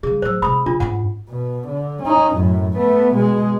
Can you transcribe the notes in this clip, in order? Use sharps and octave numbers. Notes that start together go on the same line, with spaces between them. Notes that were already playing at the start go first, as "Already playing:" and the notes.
C#3 G3 G#4
A2 F#3 C5 E6
C3 G#3 B5 D#6
C#3 D4 F4
G#2 C#4 F#5
B2
D3
C#4 D#4
F#2 A2
A3 B3
B2 G#3